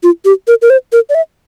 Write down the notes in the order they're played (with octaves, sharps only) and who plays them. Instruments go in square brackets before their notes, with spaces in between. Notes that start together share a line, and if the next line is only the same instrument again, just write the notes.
[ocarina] F4
G4
A#4
A#4
C5
A#4
D5
E5